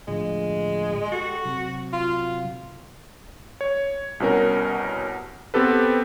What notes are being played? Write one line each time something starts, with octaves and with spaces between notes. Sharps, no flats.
A2 D3 F3 G#3
F#4 G4 A4
C3 F#3
F4
C#5
C2 B2 C#4 A#4
B3 C4 G4 A4 B4